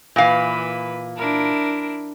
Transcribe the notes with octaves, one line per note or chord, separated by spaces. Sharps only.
A#2 E3 B4 F5
D4 E4 A#4